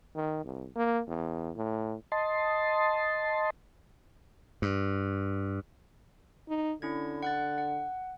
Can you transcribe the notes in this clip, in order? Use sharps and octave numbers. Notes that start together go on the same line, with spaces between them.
D#3
C2
A#3
E2
A2
D#5 A5 C6
G2
D#4
D3 C#4 E4 G#6
F#5 F#6 A6
F#5